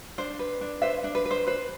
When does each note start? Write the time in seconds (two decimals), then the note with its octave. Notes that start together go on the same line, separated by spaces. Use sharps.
0.18 D4 C5
0.39 B4
0.61 D4
0.82 B4 C5 E5
1.04 D4
1.15 B4
1.25 B4
1.31 C5
1.47 B4 C5